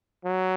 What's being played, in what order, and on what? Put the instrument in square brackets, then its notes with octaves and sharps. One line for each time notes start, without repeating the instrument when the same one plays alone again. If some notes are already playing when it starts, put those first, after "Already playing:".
[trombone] F#3